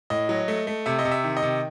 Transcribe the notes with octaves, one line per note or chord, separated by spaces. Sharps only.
A2 D#5
F#3
A3
A3
C3 E5
D#5
C3
E5
D#3
D#5
C3